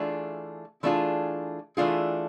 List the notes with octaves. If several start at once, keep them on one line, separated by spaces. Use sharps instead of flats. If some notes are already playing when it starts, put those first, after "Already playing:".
Already playing: E3 A3 D4 F4 G#4
E3 A3 D4 F4 G#4
E3 A3 D4 F4 G#4